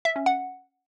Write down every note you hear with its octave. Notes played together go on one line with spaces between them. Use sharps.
E5
C#4
F#5